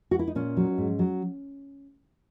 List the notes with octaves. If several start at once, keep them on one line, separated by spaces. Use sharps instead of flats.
F#4
E4
D#4
A#2 C#4
F#3
G#2
F#3